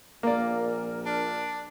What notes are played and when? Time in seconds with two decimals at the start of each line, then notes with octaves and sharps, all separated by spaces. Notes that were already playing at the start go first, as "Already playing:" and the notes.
0.23 A#1 A#2 A#3 A#4 D5
1.06 D4